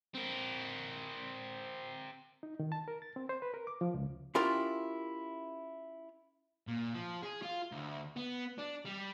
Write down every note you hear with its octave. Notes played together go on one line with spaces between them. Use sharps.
C4 A#4
D#4
D#3
A5
A#4
A6
C4
C5
B4
A#4
D6
F3
C#2
C#4 E4 F4 G4 A#4 G5
A#2
F3
G#4
F4
D2
B3
D4
G3